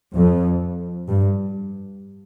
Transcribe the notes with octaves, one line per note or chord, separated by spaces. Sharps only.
F2
G2